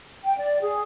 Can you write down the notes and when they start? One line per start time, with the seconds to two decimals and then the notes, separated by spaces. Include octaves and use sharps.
0.23 G5
0.38 D5
0.62 G#4